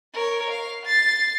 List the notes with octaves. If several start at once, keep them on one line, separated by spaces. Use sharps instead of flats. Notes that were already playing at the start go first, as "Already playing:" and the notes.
A#4 C#5
F5
A6 C7